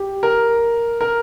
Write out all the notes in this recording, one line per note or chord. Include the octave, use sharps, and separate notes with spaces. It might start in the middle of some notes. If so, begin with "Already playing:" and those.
Already playing: G4
A#4
A#4